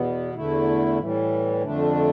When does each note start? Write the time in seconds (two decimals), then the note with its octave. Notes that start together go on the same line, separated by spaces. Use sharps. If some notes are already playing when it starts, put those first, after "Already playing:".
Already playing: E2 B2 B3
0.35 E2 D3 A3 E4
0.99 A2 E3 G3
1.63 F2 D3 A3 D4